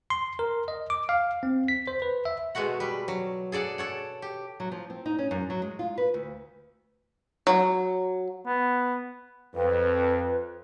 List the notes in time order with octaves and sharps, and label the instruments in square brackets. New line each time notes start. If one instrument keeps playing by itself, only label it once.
[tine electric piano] C6
A#4
D#5
D6
F5
C4
B6
C5
B4
E5
[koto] B2 G#3 A3 F#4 F#5
G3 B4
F#3
G#4 A4 D5 F#5
A4 C#5 F#5
G4
[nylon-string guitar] F#3
F3
C4
D#4
C#4
F#2
F#3
G#3
F4
B4
D2
[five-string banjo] F#3
[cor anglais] B3
[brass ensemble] F2 [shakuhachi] B4